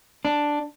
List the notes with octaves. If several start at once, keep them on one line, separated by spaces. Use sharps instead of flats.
D4